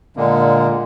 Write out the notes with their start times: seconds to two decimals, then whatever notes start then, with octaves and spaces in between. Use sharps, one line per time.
0.17 A#2 D3 G#3 A#3